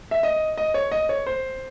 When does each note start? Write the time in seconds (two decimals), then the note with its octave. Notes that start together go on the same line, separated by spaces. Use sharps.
0.11 E5
0.23 D#5
0.57 D#5
0.74 C#5
0.92 D#5
1.09 C#5
1.27 C5